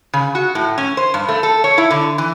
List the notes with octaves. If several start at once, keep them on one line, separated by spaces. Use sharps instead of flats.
C#3
F#4
A2
C#4
C5
G2
A3
A4
C#5
E4
D3
E3